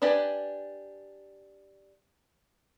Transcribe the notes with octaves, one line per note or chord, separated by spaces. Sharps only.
D4 G4 B4 D5 G#5